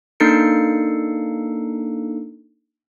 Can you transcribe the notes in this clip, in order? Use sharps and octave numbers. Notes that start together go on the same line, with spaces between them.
A#3 D4 D#4 A4 C7 C#7